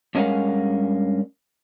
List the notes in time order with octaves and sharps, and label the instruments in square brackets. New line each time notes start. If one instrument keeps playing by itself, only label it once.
[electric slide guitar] G2 G#3 C#4 A#4 F5 F#5